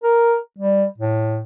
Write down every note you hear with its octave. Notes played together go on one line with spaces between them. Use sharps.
A#4
G3
A2